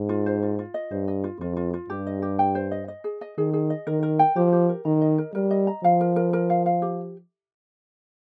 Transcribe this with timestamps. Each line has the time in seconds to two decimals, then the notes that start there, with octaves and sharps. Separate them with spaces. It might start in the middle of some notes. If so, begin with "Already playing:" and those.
Already playing: G#2
0.09 F4
0.26 C5
0.43 F4
0.59 F4
0.74 D#5
0.91 G2 C5
1.08 D#5
1.24 F4
1.40 F2 F4
1.57 F4
1.74 F4
1.90 G2 G4
2.07 D#5
2.22 G4
2.39 G5
2.55 C5
2.71 D#5
2.88 D#5
3.04 G#4
3.21 D#5
3.38 D#3 G#4
3.53 G#4
3.70 D#5
3.87 D#3 A#4
4.03 A#4
4.19 G5
4.36 F3 G4
4.52 G4
4.69 A#4
4.85 D#3 A#5
5.01 D#5
5.18 A#4
5.34 G3 A#4
5.51 D#5
5.67 A#5
5.84 F3 F5
6.01 A#4
6.16 A#4
6.33 A#4
6.50 F5
6.66 F5
6.82 G4